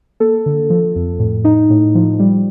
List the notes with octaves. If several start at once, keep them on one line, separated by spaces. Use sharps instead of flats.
A#3 A4
D3
F3
F2
A2
D#4
A2
F3
G3